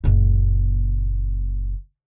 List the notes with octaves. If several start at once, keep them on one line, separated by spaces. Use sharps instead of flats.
F#1 A#2